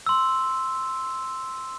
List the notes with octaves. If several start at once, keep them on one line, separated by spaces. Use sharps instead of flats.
C6 E6